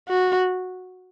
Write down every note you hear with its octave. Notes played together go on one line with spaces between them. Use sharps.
F#4